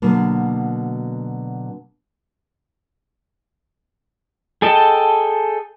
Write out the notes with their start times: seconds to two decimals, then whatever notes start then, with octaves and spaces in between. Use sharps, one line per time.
0.02 B2 D3 F#3 A#3
4.62 G#4 A4 D#5 G5 A5